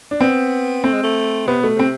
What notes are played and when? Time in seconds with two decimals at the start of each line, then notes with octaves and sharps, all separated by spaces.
0.11 D4
0.21 B3 C4
0.84 A3 C4
0.93 G#3
1.03 A3
1.47 C3 B3
1.61 B2 A3
1.75 C3 C4